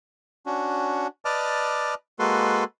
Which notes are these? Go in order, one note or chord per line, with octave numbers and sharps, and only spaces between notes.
C#4 D4 F#4
B4 D5 D#5 A5 D6 F6
G#3 A#3 F#4 A4 B4 C6